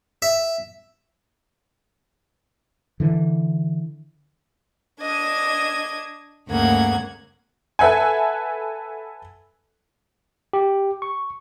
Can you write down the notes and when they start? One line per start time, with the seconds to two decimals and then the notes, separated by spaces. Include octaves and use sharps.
0.22 E5
3.00 D3 E3
5.01 D4 D#5 G#6
6.49 D2 G2 C#3 A#3 F#5 G#6
7.79 A4 B4 E5 F#5 G#5
10.53 G4
11.02 C#6